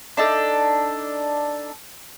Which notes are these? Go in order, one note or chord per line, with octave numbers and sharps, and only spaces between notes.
D4 D#4 A4